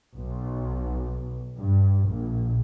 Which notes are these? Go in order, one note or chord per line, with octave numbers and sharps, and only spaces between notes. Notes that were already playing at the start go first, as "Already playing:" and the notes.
B1
G2
A#1